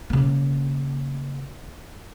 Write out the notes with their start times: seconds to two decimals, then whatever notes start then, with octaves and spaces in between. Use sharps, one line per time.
0.10 C#3 A#3